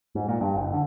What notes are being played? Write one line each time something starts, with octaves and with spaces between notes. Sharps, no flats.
G#2
A#2
G2
F#1
D3